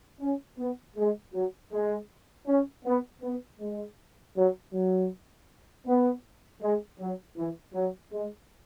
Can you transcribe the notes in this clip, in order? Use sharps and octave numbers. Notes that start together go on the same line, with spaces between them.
C#4
B3
G#3
F#3
G#3
C#4
B3
B3
G#3
F#3
F#3
B3
G#3
F#3
E3
F#3
G#3